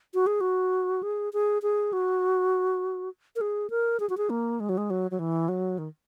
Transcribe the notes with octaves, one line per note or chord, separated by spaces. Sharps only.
F#4
G#4
F#4
G#4
G#4
G#4
F#4
A#4
G#4
A#4
G#4
F#4
G#4
A#3
G#3
F#3
G#3
F#3
F#3
E3
F#3
D#3